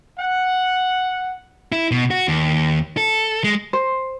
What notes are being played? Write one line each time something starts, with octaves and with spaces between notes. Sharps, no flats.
F#5
E4
B2
F#4
D#2
A4
G#3
C5